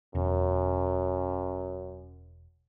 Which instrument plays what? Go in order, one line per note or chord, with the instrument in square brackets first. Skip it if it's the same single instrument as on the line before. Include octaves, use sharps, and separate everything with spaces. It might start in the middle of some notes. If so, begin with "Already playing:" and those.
[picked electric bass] E1 [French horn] F#2